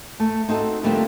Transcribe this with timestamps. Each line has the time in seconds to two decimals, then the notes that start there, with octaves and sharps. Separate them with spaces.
0.20 A3
0.49 C4 D#4 F#4 A4
0.83 D3 F3 G3 A3 A#3 C4